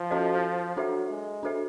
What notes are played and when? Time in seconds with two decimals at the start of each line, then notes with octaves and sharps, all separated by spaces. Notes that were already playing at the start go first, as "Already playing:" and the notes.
Already playing: F3
0.10 C#4 F#4 A4 C5 D#5
0.76 F#3 D4 F#4 A4 C5 E5
1.10 G#3
1.43 D4 F#4 A4 C5 E5